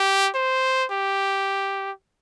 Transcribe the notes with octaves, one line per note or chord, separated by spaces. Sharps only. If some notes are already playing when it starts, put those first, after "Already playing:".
Already playing: G4
C5
G4